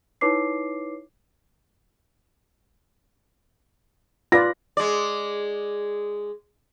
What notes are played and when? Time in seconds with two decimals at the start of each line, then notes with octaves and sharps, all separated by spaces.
0.21 D#4 E4 B4 C#5 D6 C7
4.32 F4 B4 D5 A#6
4.77 G#3 D5